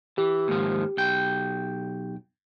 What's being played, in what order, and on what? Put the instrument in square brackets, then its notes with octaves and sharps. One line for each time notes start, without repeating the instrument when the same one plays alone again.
[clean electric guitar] E3 [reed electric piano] G4
[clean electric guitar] D#2 G#2 F3
B1 G5